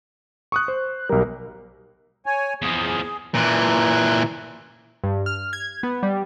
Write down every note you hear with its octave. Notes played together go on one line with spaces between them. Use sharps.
C#6 D#6 F#6
C5
F#6
B1 G3 A#4
C#5 G#5
E2 F3 G#4
A#2 E3
G2
F6
G#6
B3
G3